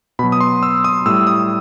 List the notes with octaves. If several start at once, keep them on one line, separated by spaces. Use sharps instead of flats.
B2 F#3 B5
D#6
C6
E6
D#6
A2 G3 E6
D#6